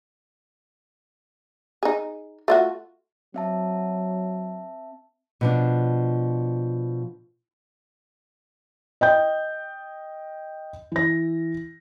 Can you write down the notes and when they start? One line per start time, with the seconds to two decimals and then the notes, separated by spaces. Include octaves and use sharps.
1.83 D#4 G#4
2.48 A3 F4 F#4
3.34 F#3 C4 E5 A5
5.41 B2 F3 D4
9.01 D#5 G5 G6
10.92 E3 A#6